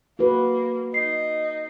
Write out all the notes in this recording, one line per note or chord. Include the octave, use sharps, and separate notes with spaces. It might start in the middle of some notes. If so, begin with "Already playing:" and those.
A#3 F#4 B4
D#4 C7